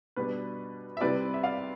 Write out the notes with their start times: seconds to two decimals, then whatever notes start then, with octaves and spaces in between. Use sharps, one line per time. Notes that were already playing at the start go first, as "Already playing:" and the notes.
0.16 B2 G3 D4 B4
0.97 E5
1.01 C3 G3 C4 E4 B4 D5
1.34 E5
1.43 D5 F5